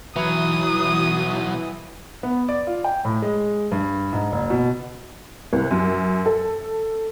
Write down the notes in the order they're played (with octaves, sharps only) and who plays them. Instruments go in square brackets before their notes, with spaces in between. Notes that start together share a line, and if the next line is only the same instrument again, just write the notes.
[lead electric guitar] B1 F#3 [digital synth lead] E3 [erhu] D#6
[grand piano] B3
D5
F4
G5
A2
G#3
G2
G#2
F#1
B2
[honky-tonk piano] C2
F#2
A4